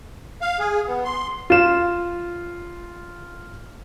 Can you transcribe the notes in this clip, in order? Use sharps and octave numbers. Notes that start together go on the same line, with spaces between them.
F5
G#4
B3
C6
F4 E7